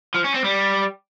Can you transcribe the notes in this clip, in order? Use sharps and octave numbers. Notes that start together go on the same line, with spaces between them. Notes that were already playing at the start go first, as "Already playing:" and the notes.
F3
C#4
C4
G3